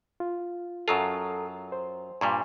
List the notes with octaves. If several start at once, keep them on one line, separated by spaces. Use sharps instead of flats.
F4
F#2 F#3 F4 A4 D#6
C5
G2 A#2 G3 G#5 C6 C#6